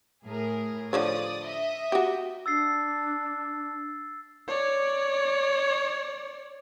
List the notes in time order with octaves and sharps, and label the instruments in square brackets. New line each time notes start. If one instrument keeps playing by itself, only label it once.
[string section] A2 G#4 A#4
[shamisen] D3 F3 C#5 [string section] D5 D#6
[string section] D#5 E5
[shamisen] F#4 G4
[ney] D4 [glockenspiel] E6 A6 C7
[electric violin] C#5 D5